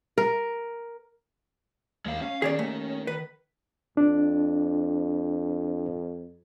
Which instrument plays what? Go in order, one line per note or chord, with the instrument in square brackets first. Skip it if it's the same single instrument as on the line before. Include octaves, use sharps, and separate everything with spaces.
[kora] A#4
[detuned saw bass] D#2 [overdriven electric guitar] G#3 F5
[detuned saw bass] C#4 [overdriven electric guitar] F5
[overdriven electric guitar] D#3 [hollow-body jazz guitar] G#4 C#5 D5
[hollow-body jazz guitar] D#2 A3
B4
[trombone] F2 [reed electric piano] D4